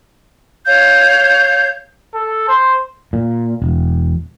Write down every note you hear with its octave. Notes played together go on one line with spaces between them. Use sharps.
C#5 F5 G6
A4
C5
A#2
E1